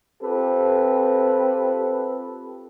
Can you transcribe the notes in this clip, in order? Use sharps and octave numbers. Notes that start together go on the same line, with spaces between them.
C4 F4 G4 A4 B4